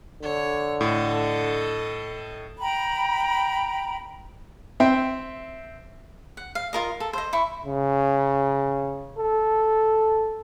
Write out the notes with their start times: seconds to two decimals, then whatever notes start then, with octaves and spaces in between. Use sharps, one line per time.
0.23 D3 C#5
0.81 A2 A4 D#5
2.60 G5 A#5 B5
4.80 C4 E5 G5
6.37 F#5
6.55 F5
6.73 F4 A#4 D#5
7.00 A4
7.13 C5 D#5
7.33 E4 C#6
7.66 C#3
9.19 A4